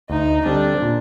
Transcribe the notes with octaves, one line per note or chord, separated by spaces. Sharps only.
D2 D#4
D3 G3 C4 D4
A#2